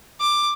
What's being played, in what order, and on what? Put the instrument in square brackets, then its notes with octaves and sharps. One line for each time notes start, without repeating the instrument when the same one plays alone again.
[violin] D6